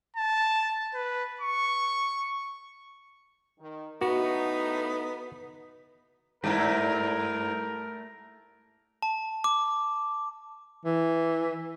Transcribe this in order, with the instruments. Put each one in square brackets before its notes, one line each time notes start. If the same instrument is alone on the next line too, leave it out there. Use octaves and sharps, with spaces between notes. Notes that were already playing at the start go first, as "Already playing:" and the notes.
[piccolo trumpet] A5
B4
C#6
[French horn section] D#3
[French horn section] A2 D#4 [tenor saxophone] B3 [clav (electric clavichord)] F#4
[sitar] G2 E4 [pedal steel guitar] A3 G4 [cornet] A#4
[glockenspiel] A5
D6
[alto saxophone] E3